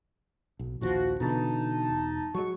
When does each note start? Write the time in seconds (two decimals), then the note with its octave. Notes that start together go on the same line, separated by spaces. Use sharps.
0.59 B1
0.81 A#1 D#2 F3 F#4
1.20 B2 D3 E3 D#4 A5
1.90 E1
2.35 F#3 G#3 C#6